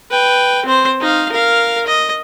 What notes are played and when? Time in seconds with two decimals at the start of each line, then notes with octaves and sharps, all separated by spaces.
0.11 B4 G5
0.66 C4 C5
1.01 D#4 F5
1.32 A#4 F5
1.87 D#5